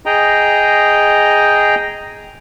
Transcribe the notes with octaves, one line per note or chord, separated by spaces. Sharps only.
G#4 D#5 G5 A#5